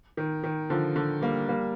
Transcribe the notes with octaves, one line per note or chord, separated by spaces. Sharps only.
D#3
D#3
D3 F3
D3
G3 A#3
G3 A#3